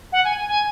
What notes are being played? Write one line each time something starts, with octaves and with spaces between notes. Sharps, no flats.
F#5
G#5
G#5
G#5